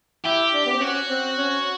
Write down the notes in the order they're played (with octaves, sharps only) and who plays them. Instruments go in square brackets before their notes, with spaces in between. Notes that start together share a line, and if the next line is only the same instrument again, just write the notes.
[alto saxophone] E4 [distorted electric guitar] G4
[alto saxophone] D4
B3
C4
[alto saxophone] C#4 [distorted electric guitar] F#4
[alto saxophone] C4
C#4